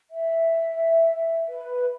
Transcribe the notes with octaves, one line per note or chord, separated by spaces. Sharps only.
E5
B4